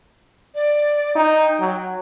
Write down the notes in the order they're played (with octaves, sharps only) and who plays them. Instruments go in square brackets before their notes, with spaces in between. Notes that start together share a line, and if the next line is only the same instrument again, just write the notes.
[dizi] D5
[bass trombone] D#4 [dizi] G5
[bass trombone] F#3